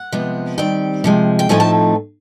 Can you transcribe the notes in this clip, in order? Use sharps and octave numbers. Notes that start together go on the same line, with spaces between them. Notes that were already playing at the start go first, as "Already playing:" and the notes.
Already playing: F#5
C3 F3 G#3 B3
D#3 G3 C4 G5
C3 F3 G#3
G5
A2 F3 A3 C4 D#4 G#5
A5